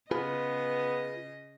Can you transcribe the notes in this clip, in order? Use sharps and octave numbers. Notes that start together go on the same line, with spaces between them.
C#3 B3 F4 G#4 B4 D#5